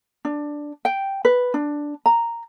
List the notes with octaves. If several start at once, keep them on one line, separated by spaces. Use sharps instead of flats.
D4
G5
B4
D4
A#5